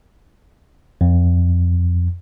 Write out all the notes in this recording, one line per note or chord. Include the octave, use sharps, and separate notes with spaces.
F2